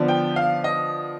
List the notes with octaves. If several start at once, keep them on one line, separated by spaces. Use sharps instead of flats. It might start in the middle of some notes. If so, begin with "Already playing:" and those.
Already playing: D3 F3 B3 D4
G5
F5
D#5